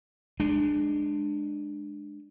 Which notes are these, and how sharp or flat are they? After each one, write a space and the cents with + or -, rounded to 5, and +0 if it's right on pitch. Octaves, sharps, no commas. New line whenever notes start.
G#3 +0 D4 +15